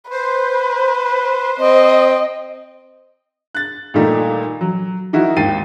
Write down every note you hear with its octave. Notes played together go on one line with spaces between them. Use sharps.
B4 C5
C4 D#5
F#6 A6
A#2 D#3 G3 A3 D#4
F#3
D#3 D#4 E4 F#4
G#1 D#2 G5 A6 C7 D#7